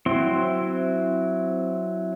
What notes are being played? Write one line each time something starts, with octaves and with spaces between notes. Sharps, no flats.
F#3 C4 E4 C6